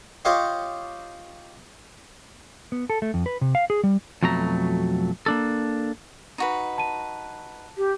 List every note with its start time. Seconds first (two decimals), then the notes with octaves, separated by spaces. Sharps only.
0.25 F4 G4 C#5 D#5 F5
2.72 B3
2.90 A4
3.02 A3
3.14 F2
3.26 B4
3.41 C3
3.55 F5
3.70 G#4
3.84 G3
4.23 F2 B2 F#3 A3 A#5
5.26 A#3 D4 A4
6.38 D#4 F#4 B4
6.78 A5 D#7
7.78 G4